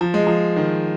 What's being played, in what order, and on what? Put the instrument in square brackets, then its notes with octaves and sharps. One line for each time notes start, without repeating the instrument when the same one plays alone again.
[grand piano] F3
G#3
F3
D#3